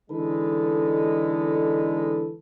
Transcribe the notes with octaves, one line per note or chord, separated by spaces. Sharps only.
D3 E3 G#3 D#4 A4 B4